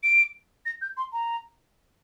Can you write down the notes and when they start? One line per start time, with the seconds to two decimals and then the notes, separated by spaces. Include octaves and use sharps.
0.03 D7
0.66 A#6
0.81 G6
0.97 C6
1.13 A#5